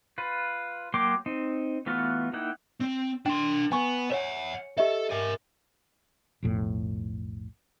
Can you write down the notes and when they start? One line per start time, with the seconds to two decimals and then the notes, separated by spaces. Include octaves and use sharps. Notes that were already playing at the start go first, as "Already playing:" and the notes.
0.18 F4 B4
0.94 F#3 A#3 G5 C6 D6
1.26 C4 D#4
1.86 E3 A3 B3 F4 F#4
2.33 A#3 D#4 E4 F#5 G5
2.80 C4
3.26 D4 G5 C6
3.72 B3 G#5 C#6
4.12 C#5 E5 F#5
4.78 G4 A4 D#5 E5
5.10 A#4 G#5
6.43 B1 F2 A2